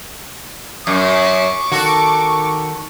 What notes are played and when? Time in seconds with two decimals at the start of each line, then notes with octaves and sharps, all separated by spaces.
0.87 F#2 C#6 D6
1.72 D#3 F#4 A4